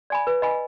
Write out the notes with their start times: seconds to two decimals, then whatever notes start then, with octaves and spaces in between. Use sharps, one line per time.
0.10 D5 G#5 B5
0.27 B4
0.42 D#5 G#5 B5